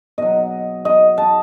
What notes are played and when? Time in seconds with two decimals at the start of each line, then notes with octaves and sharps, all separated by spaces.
0.18 B2 F#3 D#5
0.85 D#5
1.18 A5